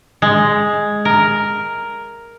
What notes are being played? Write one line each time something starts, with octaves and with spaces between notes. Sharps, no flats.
G#3
A#4